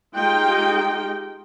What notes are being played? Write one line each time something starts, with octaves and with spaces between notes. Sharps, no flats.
G#3 D#4 F4 G4 G5